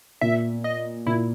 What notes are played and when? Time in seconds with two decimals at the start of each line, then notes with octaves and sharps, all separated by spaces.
0.21 A#2 E5
0.64 D#5
1.06 A#2 E4